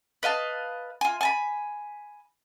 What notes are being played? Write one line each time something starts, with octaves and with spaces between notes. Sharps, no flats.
B4 D#5 F5 A5
F4 G#5
G#5 A5 B5